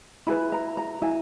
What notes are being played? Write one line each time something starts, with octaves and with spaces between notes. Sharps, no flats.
E4 G#4 B4 B5
A#5
A#5
E4 G#5